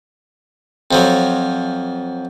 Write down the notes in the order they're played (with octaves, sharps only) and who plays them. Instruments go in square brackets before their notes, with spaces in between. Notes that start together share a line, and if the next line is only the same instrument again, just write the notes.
[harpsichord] F2 F3 F#3